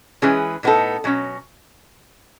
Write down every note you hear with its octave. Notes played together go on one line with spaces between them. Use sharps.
E3 G#3 C#4 G#4 B4
A2 G#3 B3 D#4 A4
B2 F#3 C#4